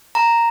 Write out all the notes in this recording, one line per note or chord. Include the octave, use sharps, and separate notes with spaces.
A#5